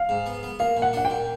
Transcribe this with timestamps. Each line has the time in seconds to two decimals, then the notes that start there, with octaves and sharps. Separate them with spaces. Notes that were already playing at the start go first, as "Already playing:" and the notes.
Already playing: F5
0.09 G#2
0.26 B3
0.43 B3
0.59 A#3 F5
0.77 A#2
0.82 F#5
0.93 D4 F#5
1.05 G5
1.10 A#2